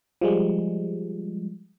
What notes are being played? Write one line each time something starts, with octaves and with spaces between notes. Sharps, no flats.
F3 G3 G#3